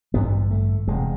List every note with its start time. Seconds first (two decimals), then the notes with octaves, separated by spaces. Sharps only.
0.14 A1 G2 D3 B3
0.51 A3
0.88 E1 D2 C3 G#3